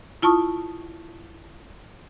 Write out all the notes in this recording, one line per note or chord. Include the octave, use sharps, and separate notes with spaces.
E4 F4 A5 C#6 D#6